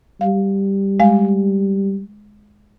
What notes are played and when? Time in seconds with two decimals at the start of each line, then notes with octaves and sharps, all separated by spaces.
0.21 G3 F5
1.00 G#3 F5